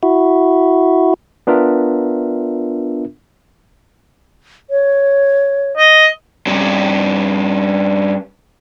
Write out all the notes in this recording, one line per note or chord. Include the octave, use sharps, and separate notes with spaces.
E4 F#4
B3 D4 F4 A#4 E5
C#5
D#5
G2 C#4